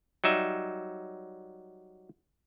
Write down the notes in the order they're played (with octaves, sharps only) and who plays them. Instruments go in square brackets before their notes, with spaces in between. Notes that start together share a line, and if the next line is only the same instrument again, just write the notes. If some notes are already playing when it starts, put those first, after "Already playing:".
[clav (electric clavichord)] F#3 G3 D#4 E5